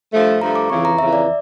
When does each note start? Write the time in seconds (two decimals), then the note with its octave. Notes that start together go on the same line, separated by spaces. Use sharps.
0.12 G2 F3 A3
0.41 G2 F3 A3 A#5
0.55 D6
0.70 F2 C#3 E3 C#6
0.85 A#5
0.99 F2 C#3 E3 E5
1.13 D5